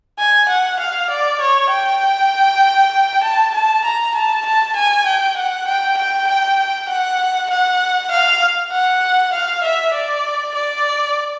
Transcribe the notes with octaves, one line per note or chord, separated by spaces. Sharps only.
G#5
F#5
F5
D5
C#5
G5
A5
A5
A#5
A5
A5
G#5
G5
F#5
G5
G5
G5
F#5
F#5
F5
F#5
F5
E5
D5
D5